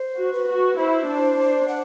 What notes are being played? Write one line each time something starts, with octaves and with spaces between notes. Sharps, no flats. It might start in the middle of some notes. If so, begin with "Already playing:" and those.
Already playing: C5
F#4
B4
F#4
E4 C5
D4
D4
F#5